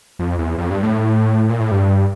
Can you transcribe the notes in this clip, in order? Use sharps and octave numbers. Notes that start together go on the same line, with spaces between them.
F2
E2
F2
G2
A2
A#2
A2
G2